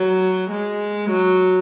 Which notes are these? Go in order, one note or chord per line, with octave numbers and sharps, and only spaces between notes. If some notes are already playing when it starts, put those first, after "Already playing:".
Already playing: F#3
G#3
F#3